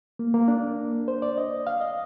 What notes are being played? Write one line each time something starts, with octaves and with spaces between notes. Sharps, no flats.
A#3
A#3
D4
C5
D5
D#5
F5
D#5